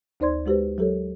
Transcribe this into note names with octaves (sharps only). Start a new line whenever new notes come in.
D2 D#4 C5 D5 C6 G#6
G#3 F#4 G4 B4 C5
F#3 G4 A4 A#4 C#5